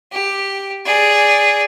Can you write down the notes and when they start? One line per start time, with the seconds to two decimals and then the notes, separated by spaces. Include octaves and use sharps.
0.12 G4
0.86 G#4 D5